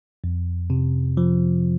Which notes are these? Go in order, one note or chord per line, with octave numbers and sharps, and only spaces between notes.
F2
C3
F3